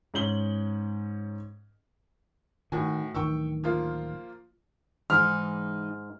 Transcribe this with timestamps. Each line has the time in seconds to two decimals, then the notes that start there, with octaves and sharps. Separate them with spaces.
0.14 G#2 C#4 F#7 G7
2.72 A2 D#3 F#4 G#5
3.15 D1 D#3 E3 G5 C#6 E6
3.64 F3 A#3 F4
5.10 G#2 E3 G#3 D#4 F6